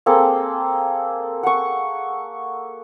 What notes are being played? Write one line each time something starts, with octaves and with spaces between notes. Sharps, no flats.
A#3 C4 G#4 A4
F#5 C#6